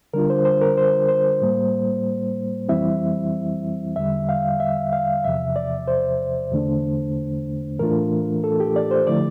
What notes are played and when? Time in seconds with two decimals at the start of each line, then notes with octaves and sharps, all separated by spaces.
0.14 D3 G3 D4 F4 A#4
0.30 C5
0.45 C5
0.61 A#4
0.77 C5
1.09 C5
1.42 A2 G3 A#3
2.69 F2 E3 G3 C4 E4 E5
3.96 E2 D3 G3 E5
4.29 F5
4.60 E5
4.93 F5
5.25 E2 C3 F3 E5
5.56 D5
5.88 C5
6.51 E2 D3 A3 D4
7.79 A2 E3 A3 D4 F4 A#4
8.44 A4
8.60 G4
8.76 D5
8.91 C5
9.07 D3 F3 A3 E4 D5